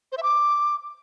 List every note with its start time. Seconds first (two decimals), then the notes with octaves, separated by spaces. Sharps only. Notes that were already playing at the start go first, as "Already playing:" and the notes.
0.12 C5
0.17 E5
0.23 D6